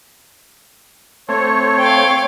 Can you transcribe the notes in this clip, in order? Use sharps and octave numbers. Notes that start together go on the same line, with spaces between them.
A3 C4 C#5
F5 G5